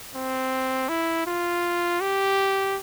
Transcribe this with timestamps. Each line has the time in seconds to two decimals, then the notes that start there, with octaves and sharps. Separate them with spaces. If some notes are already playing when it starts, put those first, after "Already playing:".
0.15 C4
0.89 E4
1.26 F4
2.01 G4